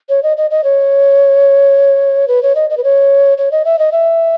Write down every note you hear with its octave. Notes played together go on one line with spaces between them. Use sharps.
C#5
D#5
D#5
D#5
C#5
B4
C#5
D#5
D#5
B4
C#5
C#5
D#5
E5
D#5
E5